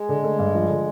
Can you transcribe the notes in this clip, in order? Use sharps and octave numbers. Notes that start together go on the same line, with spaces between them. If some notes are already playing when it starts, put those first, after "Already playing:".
Already playing: G#3
D3
A3
G2
F3
D3